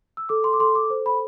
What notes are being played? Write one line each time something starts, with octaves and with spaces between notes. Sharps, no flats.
E6
A4 D6
C6
D6
A4 C6
D6
C5
B5